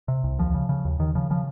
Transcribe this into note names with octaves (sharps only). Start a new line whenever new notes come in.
C3
C2
D#2 F3
C#3
C#3
D#2
D#2 D#3
C#3 F3
C#3 F3